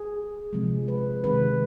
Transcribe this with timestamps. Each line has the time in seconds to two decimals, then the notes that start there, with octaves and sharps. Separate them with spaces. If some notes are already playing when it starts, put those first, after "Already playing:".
Already playing: G#4
0.53 C3 F3 G#3
0.88 B4
1.24 C3 D#3 G#3 B4